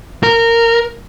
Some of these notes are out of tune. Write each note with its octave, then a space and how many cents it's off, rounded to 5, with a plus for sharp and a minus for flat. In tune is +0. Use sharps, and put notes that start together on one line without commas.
A#4 -15